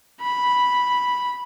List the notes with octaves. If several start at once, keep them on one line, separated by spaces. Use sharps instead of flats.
B5